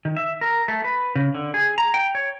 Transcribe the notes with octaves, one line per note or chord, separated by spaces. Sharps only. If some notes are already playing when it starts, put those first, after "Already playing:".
D#3
E5
A#4
A3
B4
C#3
D3
G#4
A#5
G5
C#5